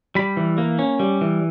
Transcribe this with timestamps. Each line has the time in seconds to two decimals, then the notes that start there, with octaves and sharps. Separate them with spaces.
0.15 G3 B5
0.37 E3
0.58 A#3
0.79 C#4
0.99 G3
1.21 E3